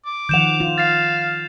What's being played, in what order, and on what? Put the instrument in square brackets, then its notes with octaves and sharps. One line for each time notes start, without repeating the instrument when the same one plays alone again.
[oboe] D6
[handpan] D#3 F3 F#5 [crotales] G6 E7 F7
[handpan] F4
[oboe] F5 [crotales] A6 C7